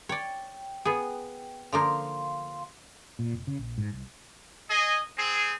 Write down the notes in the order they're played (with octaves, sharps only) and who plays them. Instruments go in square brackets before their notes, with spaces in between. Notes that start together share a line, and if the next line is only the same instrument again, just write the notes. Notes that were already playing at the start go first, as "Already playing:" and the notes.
[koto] C#5 D5 [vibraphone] G5
[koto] B3 G#4
[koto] D3 F3 A#3 [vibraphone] F5 C6
[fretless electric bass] A#2
F1
C#3
A#1
G#2
C2
[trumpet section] G#4 D#5
C4 G#4